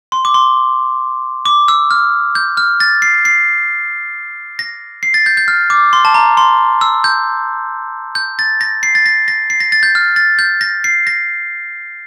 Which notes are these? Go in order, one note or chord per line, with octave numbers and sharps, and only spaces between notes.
C6
D6
C6
D6
E6
F6
G6
F6
A6
C7
C7
A#6
C7
A6
G6
G6
F6
D6
C6
A5
A#5
C6
E6
G6
G6
A6
A#6
C7
A6
A#6
A#6
C7
A#6
A6
G6
F6
A6
G6
A#6
C7
A#6